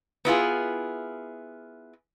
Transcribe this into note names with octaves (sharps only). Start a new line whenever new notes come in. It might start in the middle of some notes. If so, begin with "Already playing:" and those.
B3 E4 F4 G#4